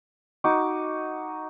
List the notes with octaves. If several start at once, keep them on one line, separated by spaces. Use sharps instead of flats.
D#4 F#4 D6